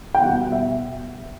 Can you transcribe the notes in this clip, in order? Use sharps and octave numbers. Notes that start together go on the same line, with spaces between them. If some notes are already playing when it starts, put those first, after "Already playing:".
G5
B2 G3 B3 F#5
E5